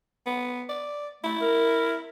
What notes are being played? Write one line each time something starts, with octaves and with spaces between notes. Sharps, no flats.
B3
D5
A3 E4
A#4